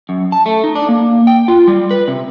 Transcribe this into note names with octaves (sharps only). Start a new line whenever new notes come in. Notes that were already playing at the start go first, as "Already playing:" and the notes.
F#2
A5
A3
D#4
D4
A#3
G5
F4
G3
B4
C3